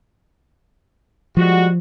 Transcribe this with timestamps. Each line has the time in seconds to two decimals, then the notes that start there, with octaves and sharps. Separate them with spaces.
1.37 F3 G3 G#3 F#4